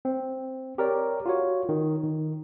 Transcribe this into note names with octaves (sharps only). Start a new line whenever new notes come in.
C4
G4 A#4 C#5 D5
F4 F#4 C#5
D#3
D#3